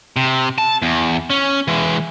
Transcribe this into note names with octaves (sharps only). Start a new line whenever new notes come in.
C3
A5
E2
C#4
E3 G#3